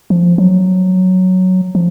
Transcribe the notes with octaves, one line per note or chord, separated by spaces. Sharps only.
F3
F#3
F3